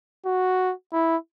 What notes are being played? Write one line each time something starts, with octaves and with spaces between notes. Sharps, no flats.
F#4
E4